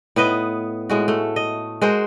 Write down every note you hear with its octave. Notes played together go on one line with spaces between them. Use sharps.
A2 B3 B4 D#5
A2 G#3 F#4
A3
D#5
G#3 F#4 A#4 C5